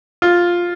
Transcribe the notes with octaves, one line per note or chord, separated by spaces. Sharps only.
F4